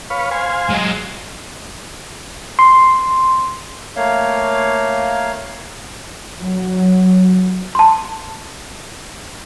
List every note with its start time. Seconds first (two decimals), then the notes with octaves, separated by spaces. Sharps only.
0.10 B4 C#5 F5
0.31 C5 F5 G#5
0.69 F#3 G#3
2.59 C6
3.96 A3 A#3 C#5 F5
6.38 F#3
7.75 A5 C6